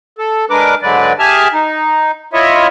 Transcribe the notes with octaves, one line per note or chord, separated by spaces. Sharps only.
A4
G#3 D4 A#4 B4 D6
G#2 D3 F#3 G#3 B4 D5
G4 G#4 E5 G#5 A5 F6
D#4
E4 F4 C#5 D#5 E5